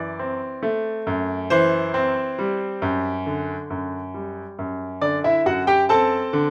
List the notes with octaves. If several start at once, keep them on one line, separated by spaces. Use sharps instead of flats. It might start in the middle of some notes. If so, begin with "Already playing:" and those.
Already playing: F#2 E3 D5
C4
A3
F#2
E3 C5
C4
G3
F#2
D3
F#2
G3
F#2
D3 D5
E4 E5
F#2 F#4 F#5
G4 G5
C4 A4 A5
D3